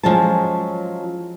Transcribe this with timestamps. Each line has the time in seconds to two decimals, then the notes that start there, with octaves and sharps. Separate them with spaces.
0.03 F3 F#3 G#3 C#4 F4 A5